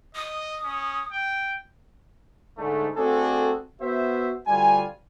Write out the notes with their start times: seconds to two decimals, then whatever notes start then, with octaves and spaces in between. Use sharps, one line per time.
0.15 D#5 D#6
0.64 C#4
1.11 G5
2.58 G#2 D3 A3
2.97 A3 C4 D4 F#4 G#4 A4
3.81 B3 F#4 C5 E5
4.47 D2 G3 F4 G#5